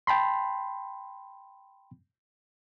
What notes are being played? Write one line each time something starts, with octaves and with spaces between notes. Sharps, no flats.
G5 A5 B5 C6